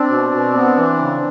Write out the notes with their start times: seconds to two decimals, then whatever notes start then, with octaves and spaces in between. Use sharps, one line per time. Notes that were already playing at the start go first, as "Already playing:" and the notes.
Already playing: C4 D4
0.09 B2
0.31 B2
0.54 B3
0.76 E3
0.99 C#3